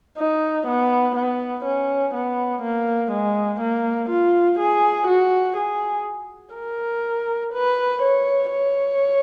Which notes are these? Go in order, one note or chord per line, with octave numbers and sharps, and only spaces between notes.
D#4
B3
B3
C#4
B3
A#3
G#3
A#3
F4
G#4
F#4
G#4
A#4
B4
C#5
C#5